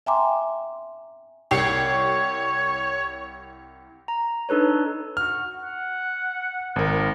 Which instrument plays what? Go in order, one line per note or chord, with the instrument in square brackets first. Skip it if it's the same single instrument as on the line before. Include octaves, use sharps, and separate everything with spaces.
[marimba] E5 G5 G#5 A#5 C6 D6
[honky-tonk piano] C2 G4 C7 [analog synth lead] C#5
[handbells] A#5
D4 D#4 A4 B4 C#5
[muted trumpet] F#4 [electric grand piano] F6
[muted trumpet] F#5
[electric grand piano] G#1 A#4